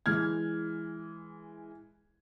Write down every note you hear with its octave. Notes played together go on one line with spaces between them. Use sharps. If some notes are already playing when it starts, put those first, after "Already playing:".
E3 G#3 F6 G#6